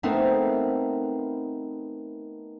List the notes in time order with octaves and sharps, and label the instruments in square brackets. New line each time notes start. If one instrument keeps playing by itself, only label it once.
[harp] A3 B3 C4 D#4 A#4